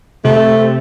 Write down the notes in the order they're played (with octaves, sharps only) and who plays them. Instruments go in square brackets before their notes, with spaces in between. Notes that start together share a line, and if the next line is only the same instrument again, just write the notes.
[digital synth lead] C3 [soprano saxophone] A3